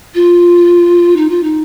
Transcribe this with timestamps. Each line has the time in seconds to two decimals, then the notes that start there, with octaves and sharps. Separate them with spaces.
0.14 F4
1.16 D#4
1.29 F4
1.43 D#4